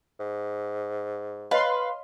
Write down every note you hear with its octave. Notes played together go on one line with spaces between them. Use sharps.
G#2
B4 C#5 D#5 F5 C6